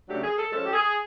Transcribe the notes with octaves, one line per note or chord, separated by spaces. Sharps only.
C#3 F#3 A3 D4 G4
G#4
A4
F3 G#3 C#4 A4
G4
G#4